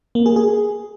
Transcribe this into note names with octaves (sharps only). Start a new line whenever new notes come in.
A#3
G#4
G#4